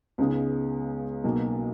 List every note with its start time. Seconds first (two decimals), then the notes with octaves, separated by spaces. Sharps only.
0.18 C#2 C#3 G#3 B3 D#4
1.24 B1 B2 A#3